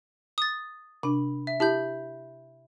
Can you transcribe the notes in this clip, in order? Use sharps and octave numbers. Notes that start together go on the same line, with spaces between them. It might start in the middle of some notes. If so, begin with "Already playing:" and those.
D#6 A6
C3 D4 B5
E5
E4 G4 E5 A5 B5 G6